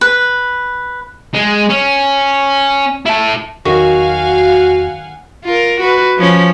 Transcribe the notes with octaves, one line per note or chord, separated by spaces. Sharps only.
B4
G#3
C#4
E4 A5
E2 D#3 F#3 F#4 D#5 F5 F#5 G#5
F4 A#4
F#4 B4
F3 C#4